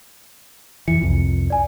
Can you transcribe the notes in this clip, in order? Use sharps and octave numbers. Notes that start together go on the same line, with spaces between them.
F2 E3 C#7
C2 F2
D5 G#5